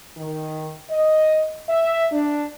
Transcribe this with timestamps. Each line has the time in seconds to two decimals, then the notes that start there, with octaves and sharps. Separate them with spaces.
0.17 D#3
0.90 D#5
1.68 E5
2.12 D4